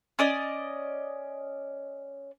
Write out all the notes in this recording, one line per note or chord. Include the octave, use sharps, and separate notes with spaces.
C#4 D5 D#5